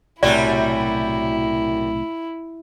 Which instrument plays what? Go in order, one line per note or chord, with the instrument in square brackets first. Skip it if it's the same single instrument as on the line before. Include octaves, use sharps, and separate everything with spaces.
[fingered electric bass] B1 A2 C3 [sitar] F#2 G3 F#4 [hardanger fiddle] E4 [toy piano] D5